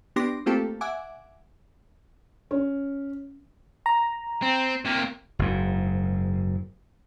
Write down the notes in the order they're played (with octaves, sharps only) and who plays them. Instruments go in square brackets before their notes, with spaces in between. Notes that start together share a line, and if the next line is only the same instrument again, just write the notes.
[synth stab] B3 D4 G4 C6 D6 A#6
A3 A#3 C4 F4 G4 A4
E5 F#5 G#5 D6
[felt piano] C#4
[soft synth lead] A#5
[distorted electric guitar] C4
C3 A#3
[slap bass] F#1 G#2